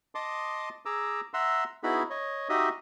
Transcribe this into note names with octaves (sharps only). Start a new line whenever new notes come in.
D#5 A5 C6 D6 D#6
G#4 A#5 D6 E6
E5 F#5 A#5 C6 E6
B3 D#4 E4 F#4 G#4 B5
C#5 D#5
D#4 F#4 G4 D#5 E5 D#6